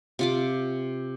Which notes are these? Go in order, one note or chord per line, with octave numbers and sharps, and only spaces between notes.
C3 F4 D6